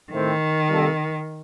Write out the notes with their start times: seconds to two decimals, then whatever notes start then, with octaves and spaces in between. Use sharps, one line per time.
0.12 A2 D#3 A3 C4
0.69 C3 G3 A#3 F4 A4